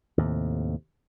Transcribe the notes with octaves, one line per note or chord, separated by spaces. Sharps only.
D#2 A2 C3